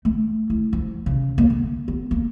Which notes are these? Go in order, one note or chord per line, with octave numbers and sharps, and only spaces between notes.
A3
E4
F3
C#3
A#3
D3
B3
A#3